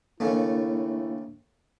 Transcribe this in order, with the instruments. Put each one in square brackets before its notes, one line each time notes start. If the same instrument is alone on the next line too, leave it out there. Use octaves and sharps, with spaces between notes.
[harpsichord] D#2 C#3 A3 [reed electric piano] A#3 D4 [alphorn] E4